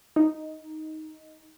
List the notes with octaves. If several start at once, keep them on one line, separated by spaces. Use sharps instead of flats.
D#4